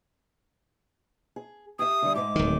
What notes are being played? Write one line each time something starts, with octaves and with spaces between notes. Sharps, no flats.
G#4
G4 E5 D#6
D3 G3
G#2 G#3 D6
D1 D#3